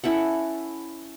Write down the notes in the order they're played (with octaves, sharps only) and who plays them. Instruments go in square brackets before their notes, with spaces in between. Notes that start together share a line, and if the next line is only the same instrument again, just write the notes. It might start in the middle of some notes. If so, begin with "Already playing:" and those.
[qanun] C#4 E4 A4 F#5